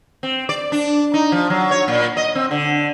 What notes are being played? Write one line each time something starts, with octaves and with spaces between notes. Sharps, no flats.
C4
D5
D4
D#4
F3
F#3
C#5
A#2
D#5
C4
D3